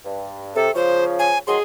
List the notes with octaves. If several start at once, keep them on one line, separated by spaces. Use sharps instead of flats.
G2
C3 A4
C#3 F3 C5 C#5
G#5
D#3 F#3 G#4 C6